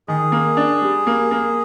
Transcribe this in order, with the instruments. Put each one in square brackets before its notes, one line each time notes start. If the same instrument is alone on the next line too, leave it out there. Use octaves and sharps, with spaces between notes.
[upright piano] D#3 [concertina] G#4
[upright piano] A#3
D4
G3
A#3
A#3